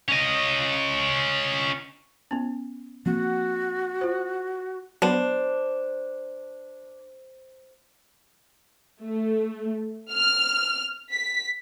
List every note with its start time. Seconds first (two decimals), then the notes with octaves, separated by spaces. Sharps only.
0.08 C#4 D#5
2.31 B3 C#4
3.06 F3 A#3 C4 F#4
4.01 F4 C5
5.02 F#3 B3 D4 C5
9.02 A3
10.11 F6
11.12 B6